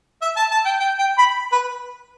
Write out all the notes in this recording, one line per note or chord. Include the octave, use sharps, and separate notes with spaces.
E5
A5
A5
G5
G5
G5
B5
B4